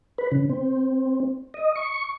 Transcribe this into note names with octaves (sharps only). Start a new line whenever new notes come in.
B4
C#3
C4
D#5
C#6